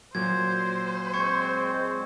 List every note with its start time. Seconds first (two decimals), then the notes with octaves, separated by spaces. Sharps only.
0.15 A#2 F#3 C5 G#6
1.14 G#3 C4 C#6 G#6 C#7